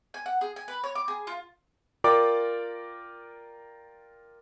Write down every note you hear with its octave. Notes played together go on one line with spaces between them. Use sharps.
G#5
F#5
G#4
G#5
B4
C#5
D6
G#4
F4
F4 A#4 D5 G5 D6